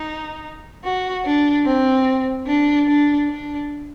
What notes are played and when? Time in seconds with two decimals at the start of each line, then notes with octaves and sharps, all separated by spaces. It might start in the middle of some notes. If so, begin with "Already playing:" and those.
Already playing: D#4
0.84 F#4
1.25 D4
1.66 C4
2.47 D4
2.88 D4
3.29 D4